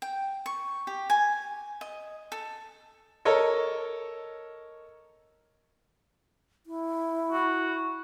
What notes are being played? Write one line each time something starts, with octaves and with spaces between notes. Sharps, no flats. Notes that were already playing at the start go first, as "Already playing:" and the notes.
G5
C#6
G4
G#5
D#5
A4
A4 A#4 C#5 D#5
E4
F#4